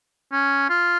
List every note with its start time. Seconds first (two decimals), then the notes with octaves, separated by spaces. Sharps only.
0.33 C#4
0.70 F4